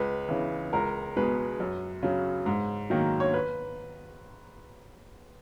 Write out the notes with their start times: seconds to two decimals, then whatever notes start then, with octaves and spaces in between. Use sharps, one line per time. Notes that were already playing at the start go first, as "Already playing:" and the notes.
Already playing: C#2 B4
0.29 C#3 E3
0.73 C#2 A#4
1.16 B2 G#3 B4
1.60 F#2
2.03 C#3 F#3
2.46 G#2
2.90 D#3 F#3 A#3
3.20 C#5
3.34 B4